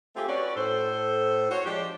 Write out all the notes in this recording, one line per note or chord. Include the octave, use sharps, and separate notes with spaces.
A3 C4 F4 G4 G#4
C#4 F#4 B4 C#5 D5
A2 A4 C5
F#4 C5 C#5
F3 G#3 D4 G4